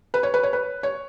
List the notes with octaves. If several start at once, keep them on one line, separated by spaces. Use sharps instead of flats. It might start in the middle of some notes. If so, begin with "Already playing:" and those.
B4
C#5
B4
C#5
B4
C#5